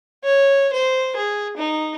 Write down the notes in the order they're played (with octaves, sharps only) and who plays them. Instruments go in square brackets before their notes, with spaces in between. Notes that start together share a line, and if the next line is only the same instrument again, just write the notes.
[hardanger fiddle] C#5
C5
G#4
D#4